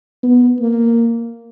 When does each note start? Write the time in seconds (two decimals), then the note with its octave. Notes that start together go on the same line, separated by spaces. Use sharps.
0.23 B3
0.60 A#3